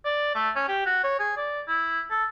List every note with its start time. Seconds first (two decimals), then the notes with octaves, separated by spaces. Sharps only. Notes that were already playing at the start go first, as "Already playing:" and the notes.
0.05 D5
0.35 A3
0.56 C#4
0.68 G4
0.86 F#4
1.04 C#5
1.19 G#4
1.37 D5
1.68 E4
2.10 A4